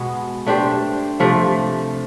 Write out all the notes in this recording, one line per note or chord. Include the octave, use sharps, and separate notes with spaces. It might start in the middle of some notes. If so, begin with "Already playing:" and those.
Already playing: B2 G#3 B3
A3 D4 G4 C5
C3 F3 A3